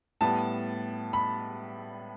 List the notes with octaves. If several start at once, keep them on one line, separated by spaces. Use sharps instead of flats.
A2 G3 B3 A5
B5